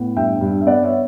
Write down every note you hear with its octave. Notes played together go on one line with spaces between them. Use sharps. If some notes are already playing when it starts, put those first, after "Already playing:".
Already playing: A2 B3
G2 E5 G5
G2
E5
B3 D5 F#5
C#5 E5